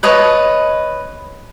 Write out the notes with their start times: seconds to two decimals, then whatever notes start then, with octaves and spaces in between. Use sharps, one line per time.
0.03 B4 C#5 D#5 A5